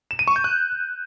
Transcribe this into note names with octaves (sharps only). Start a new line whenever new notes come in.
E7
D#7
C#6
G6
F#6